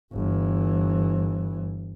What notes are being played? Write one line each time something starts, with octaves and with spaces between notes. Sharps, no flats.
G1 E3